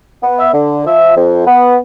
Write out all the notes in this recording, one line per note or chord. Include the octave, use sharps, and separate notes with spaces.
B3
E5
D3
F3 E5
F2
B3